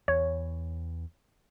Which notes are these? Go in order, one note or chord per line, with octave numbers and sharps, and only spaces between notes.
E2 C#5